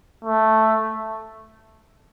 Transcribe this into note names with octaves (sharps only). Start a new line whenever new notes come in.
A3